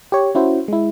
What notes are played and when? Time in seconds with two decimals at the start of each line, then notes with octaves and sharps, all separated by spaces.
0.12 G4 C#5
0.35 C#4 E4 F#4 C5
0.68 G#3 E4